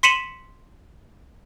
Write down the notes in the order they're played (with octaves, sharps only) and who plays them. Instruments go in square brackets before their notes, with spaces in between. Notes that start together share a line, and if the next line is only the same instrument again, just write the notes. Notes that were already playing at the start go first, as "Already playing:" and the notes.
[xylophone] C6 B6 C#7 D#7 E7 F#7